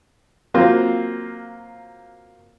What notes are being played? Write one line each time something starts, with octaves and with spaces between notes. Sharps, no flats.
F#3 A#3 C4 F4